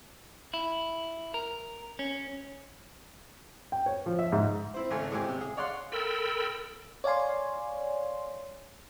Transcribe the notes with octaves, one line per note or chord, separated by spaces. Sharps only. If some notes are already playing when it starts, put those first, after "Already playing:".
E4
A#4
C#4
G5
C#5
F3
E5
G#2
C4 E4 C5
G#1 C#2 A3 G#5
A2 G#3 C4 G4 G#5
C3
G#4
C#5 D5 F5 F#5 C6
A4 A#4 G5 B5 E6
C#5 D5 F5 G#5 C6